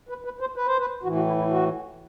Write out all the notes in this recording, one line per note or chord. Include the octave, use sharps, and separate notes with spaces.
B4
B4
C5
B4
C5
B4
A2 E3 F#4
F#4
E4
E4
F#4